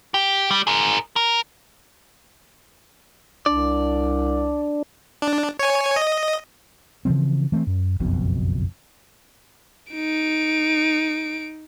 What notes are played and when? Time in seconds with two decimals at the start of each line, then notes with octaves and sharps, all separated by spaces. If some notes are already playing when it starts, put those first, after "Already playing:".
0.14 G4
0.51 G3
0.67 G#4 A#4
1.16 A#4
3.46 C2 D4 D5
5.22 D4
5.59 C#5 G#5
5.96 D#5
7.05 C#3 E3 F3 C4
7.52 E3 A3 A#3 C4
7.67 F#2
8.00 F#1 B1 F2 B2
9.92 D#4 D7